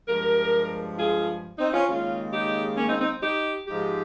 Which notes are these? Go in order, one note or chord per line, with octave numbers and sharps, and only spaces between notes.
G2 F3 G#3 G4 A#4
F4 G#4
C4 D#4
C#4 F4
D#2 C#3 G#3 C#4 F4
D#4 G4
A#3 C#4
C4 D#4
C4 D#4
D#4 G4
G#2 F3 G#3 D#4 G4